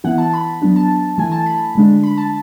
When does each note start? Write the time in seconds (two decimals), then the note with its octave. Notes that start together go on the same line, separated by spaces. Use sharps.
0.04 E3 B3 E4 F#5
0.18 A5
0.33 B5
0.62 F#3 B3 D4
0.76 A5
1.18 E3 A3 E4 G#5
1.32 A5
1.46 B5
1.75 D3 G#3 D4
2.03 B5
2.17 A5